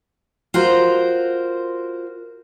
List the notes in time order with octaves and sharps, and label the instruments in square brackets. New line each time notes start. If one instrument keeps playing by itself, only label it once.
[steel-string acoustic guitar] F4 F#4 A#4 C5